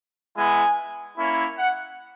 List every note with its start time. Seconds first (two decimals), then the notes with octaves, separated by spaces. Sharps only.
0.35 G#3 B3 E4 G#5
1.16 A#3 C#4 E4
1.57 F#5